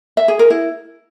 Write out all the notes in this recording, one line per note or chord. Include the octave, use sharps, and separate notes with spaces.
E5
G#4
A#4
E4